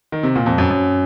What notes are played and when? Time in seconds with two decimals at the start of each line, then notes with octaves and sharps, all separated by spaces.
0.12 D#3
0.23 C3
0.35 A#2
0.46 F2
0.58 F#2
0.70 F#2